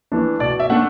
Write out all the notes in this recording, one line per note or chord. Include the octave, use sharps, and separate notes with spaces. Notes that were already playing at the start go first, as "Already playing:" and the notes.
E3 A3 D4
B2 D5
E5
A3 D4 F#5